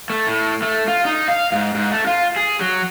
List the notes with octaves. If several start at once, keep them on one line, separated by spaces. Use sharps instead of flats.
A3
A2
A3
F4
D#4
F5
G#2
G#2
A3
F4
G#4
F#3